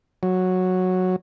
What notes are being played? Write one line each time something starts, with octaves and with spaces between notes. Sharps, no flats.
F#3